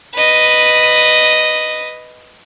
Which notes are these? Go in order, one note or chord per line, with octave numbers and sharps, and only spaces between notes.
B4 D#5